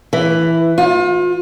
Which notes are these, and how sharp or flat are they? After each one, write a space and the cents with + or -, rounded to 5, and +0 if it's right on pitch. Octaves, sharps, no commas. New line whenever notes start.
E3 +5
F4 +40